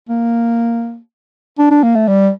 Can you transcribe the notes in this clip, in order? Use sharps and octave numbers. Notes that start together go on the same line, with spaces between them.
A#3
D4
D4
A#3
A3
G3